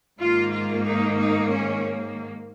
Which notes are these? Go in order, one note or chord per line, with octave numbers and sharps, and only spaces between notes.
G#2 D#3 A#3 F4
F4
D#4
D#4
C#4